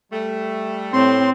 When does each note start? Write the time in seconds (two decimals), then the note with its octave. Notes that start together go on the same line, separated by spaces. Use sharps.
0.12 G3 A3
0.93 A2 C4 C6